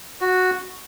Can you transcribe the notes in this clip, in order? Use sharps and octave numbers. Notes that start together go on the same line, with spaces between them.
F#4